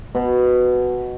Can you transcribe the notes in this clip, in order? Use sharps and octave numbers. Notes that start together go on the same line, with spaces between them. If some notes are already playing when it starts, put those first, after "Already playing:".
B2